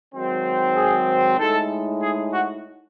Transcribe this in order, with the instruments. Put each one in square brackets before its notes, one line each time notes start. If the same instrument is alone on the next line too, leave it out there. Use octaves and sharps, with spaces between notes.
[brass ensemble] G#2 D#3 F#3 C4
G#4
A2 G#3 D#4 A4
G#4
F#4